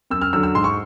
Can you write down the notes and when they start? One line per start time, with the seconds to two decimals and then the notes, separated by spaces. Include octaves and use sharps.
0.10 F#2 E6
0.22 F6
0.33 D3 F#3 E6
0.43 E6
0.55 G#2 C6
0.64 C#6